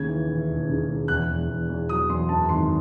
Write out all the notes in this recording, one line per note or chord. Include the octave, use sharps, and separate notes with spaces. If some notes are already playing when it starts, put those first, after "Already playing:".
Already playing: D#2 C#3 G#6
E3
E3
E1
C#3
E1
E2 F#6
E2
E2
E2
F#3 D#6
E2 C6
F#2 A5
G#1 C6